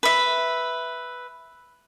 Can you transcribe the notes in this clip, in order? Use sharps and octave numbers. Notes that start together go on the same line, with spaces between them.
B4 E5